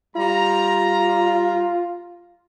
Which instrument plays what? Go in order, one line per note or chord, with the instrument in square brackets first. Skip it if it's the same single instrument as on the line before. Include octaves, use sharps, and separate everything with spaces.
[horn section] G3 A#5 [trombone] F4